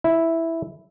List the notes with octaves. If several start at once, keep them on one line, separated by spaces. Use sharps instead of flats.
E4